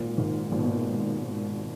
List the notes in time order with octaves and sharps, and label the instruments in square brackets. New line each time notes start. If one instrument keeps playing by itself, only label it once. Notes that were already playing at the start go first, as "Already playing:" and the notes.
Already playing: [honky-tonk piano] G#1 [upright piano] A#2
[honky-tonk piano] G#2 D#3
[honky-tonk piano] G#1 [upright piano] A#2
[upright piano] B2
A#2